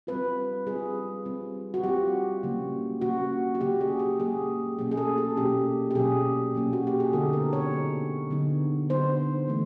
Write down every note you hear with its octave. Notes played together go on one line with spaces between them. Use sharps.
G3 C4 F4 B4
G3 C4 F4 G#4
G3 C4 F4
F#4
G3 C4 F4 G4
C#3 F#3 A#3
C#3 F#3 A#3 F#4
F#4
C#3 F#3 A#3 G4
G#4
G4
C#3 F#3 A#3 G#4
B2 F#3 A#3 C#4 G#4
G#4
A4
G#4
B2 F#3 A#3 C#4 G4
G4
B2 F#3 A#3 C#4 G#4
B2 F#3 A#3 C#4
F#4
G4
G#4
D3 F#3 B3 D#4 A4
A#4
C#5
D3 F#3 B3 D#4
D3 F#3 B3 D#4
D3 F#3 B3 D#4 C5
E3 A3